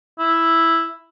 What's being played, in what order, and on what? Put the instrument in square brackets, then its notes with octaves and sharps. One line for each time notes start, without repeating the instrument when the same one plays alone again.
[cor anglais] E4